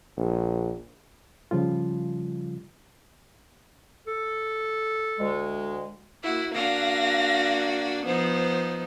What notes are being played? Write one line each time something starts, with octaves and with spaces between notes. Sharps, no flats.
A#1
C#3 F3 G3 F4
A4
D2 G#3
A#3 E4 F#4
A#3 D4 F#4 F5 A#6
F3 B3 D#4 C5